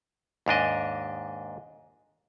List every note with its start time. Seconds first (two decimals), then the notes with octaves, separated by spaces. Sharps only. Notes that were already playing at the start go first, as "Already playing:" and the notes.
0.46 D#2 G#2 D4 D#5